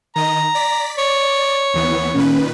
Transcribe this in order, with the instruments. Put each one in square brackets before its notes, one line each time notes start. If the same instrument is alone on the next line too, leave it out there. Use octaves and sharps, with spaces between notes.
[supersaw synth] D#3 D#5 [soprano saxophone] A#5
[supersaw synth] D5 B6
[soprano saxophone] C#5 [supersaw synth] D5
[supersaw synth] D#2 E3 B3
[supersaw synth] A#2 D#3 B4 [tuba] C#4